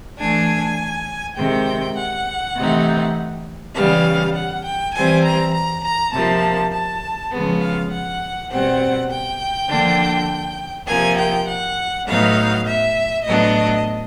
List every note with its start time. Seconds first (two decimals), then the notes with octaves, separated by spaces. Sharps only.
0.19 E3 A3 D4 G#5
1.37 C3 D#3 G#3 C4 G5
1.96 F#5
2.56 C3 E3 A3 C4 D#4
3.75 C#3 E3 G3 B3 F5
4.34 F#5
4.65 G5
4.94 E3 G3 C4 G#5
5.23 A#5
5.54 A#5
5.83 A#5
6.12 C3 F3 A#3 A5
6.72 A5
7.32 C#3 F3 G#3 B3
7.61 F5
7.91 F#5
8.50 B2 G3 C4 F#5
9.10 G5
9.69 D3 F3 A#3 D4
10.87 C3 F3 A#3 G#5
11.18 G5
11.47 F#5
12.07 A2 F#3 B3 D#4 F5
12.66 E5
13.25 A2 F#3 B3 D4 D#5